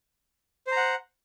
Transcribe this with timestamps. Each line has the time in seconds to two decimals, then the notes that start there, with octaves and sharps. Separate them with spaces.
0.67 C5
0.72 A#5
0.77 F#5